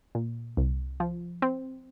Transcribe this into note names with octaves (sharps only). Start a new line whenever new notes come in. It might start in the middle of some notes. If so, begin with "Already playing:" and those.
A#2
C2
F3
C4